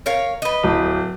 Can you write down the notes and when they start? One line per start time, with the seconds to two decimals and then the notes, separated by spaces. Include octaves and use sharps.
0.06 A#4 C#5 F5
0.42 B4 D#5
0.63 D1